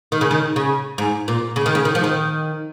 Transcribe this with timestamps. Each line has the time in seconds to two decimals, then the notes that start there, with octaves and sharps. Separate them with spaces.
0.12 D#3
0.21 C#3
0.31 D#3
0.56 C#3
0.98 G#2
1.28 A#2
1.56 C#3
1.66 D#3
1.75 C#3
1.85 D#3
1.95 F3
2.04 D#3